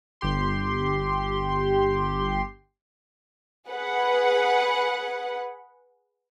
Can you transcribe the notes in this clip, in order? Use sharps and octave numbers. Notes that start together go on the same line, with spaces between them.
G1 G4 C6
G#4 B4 F#5